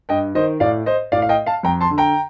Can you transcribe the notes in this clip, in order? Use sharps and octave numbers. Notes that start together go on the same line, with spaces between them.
G2 D#5 G5
D#3 C5 D#5
A2 D5 F5
C5 D#5
A2 D5 F5
F5
D#5 G5
F5 A5
F2 G5 A#5
A5 C6
D3
G5 A#5